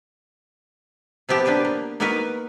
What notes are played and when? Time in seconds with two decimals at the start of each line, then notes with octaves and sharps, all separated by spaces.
1.29 C3 F3 B3 G4 A5
1.45 A#3 B3 D4 G4 B4
1.65 A#3
2.00 A#3 B3 D#4 F#4 A#4 B4